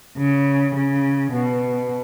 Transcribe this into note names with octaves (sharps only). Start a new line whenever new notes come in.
C#3
C#3
B2